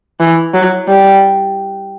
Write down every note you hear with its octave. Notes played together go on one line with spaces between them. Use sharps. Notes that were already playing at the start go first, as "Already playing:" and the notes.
E3
F#3
G3